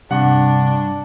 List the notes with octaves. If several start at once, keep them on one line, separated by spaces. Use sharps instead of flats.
G2 C3 D4 F#5